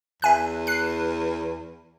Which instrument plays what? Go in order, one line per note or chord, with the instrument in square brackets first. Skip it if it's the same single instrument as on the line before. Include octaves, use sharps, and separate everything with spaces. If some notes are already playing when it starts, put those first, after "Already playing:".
[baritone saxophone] E2 [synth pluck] E5 G#5 F#6
[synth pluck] F#6 C7